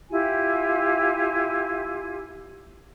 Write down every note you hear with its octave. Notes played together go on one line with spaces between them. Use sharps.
E4 F4 G4 G#5